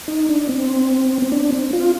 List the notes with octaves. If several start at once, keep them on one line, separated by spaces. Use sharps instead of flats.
D#4
D4
C4
C4
D4
C4
F4